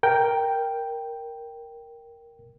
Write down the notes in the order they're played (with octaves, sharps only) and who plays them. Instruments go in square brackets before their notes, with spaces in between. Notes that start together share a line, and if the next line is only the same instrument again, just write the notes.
[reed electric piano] A#4 G5